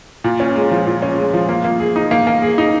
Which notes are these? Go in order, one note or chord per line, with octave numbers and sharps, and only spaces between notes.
A#2
C#4
G#3
F3
A#2
C#4
G#3
F3
A#3
A#3
G#4
D#4
A#3
A#3
G#4
D#4